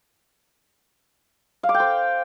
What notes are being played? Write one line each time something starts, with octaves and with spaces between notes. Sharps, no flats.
F5
D6
G5
C5